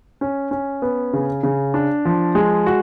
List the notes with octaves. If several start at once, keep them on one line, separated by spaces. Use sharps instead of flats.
C#4
C#4
B3
C#3
C#3
D4
F3
G#3
F#4